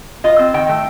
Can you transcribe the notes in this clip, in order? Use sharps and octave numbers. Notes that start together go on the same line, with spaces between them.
F4 D#5
C4
D#3 G5
A3